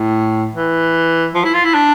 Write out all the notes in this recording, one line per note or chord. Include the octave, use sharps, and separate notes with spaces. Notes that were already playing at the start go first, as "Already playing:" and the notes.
Already playing: A2
E3
F3
E4
F4
E4
D4